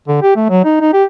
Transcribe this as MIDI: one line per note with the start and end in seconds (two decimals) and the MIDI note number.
0.08 0.18 50
0.23 0.35 67
0.36 0.45 57
0.49 0.60 54
0.65 0.77 63
0.81 0.90 63
0.93 1.05 67